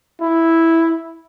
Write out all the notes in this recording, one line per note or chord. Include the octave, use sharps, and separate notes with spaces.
E4